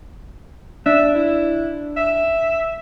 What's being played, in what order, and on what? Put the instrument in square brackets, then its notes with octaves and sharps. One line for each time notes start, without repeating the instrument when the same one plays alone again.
[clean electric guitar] D4 [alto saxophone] E5
[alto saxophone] E4
E5